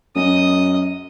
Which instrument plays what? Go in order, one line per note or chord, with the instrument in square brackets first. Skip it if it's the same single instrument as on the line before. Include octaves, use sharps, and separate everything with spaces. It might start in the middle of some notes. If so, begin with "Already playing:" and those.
[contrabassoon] F#2 [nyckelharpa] D#5 D#6